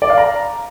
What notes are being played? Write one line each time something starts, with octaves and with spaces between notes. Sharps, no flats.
D5
F5
A#5